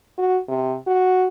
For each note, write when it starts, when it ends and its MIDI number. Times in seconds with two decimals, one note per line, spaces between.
0.18 0.38 66
0.48 0.75 48
0.87 1.27 66